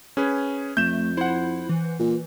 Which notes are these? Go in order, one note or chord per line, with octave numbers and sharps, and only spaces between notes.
C#4 G#4 B4
F2 A3 G6 E7
E4 C5 F#5
E3
A#2